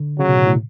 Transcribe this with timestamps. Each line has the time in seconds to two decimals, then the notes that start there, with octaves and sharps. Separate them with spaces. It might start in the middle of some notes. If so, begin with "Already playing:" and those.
Already playing: D3
0.19 C#3 F#3
0.28 B2
0.36 A2
0.46 A2